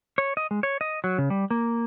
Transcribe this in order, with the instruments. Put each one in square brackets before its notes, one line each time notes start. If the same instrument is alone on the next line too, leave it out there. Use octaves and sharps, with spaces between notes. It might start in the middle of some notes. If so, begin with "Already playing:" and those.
[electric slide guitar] C#5
D#5
G#3
C#5
D#5
F#3
C#3
G3
A#3